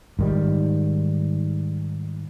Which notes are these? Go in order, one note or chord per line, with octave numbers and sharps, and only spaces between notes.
G#2 D#3 G3